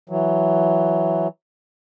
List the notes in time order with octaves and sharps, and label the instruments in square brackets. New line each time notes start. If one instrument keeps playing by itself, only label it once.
[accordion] E3 F#3